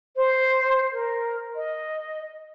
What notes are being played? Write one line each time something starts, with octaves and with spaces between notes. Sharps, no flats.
C5
A#4
D#5